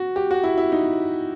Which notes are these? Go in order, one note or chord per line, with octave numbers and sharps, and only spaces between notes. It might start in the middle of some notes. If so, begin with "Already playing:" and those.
Already playing: F#4
G4
F#4
E4
E4
D#4